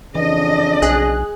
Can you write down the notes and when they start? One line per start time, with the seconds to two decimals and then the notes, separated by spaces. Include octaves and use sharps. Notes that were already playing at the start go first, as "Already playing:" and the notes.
0.15 F2 C#3 E3 D4 D#5
0.82 B1 G#4 F#6